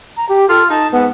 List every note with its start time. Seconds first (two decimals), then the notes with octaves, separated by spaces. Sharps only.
0.17 A#5
0.29 G4
0.49 F4 A4
0.70 D#4 A5
0.92 G#2 B3